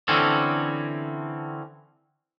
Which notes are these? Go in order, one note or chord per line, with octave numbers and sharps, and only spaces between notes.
D3 E3 C4 C#4 A4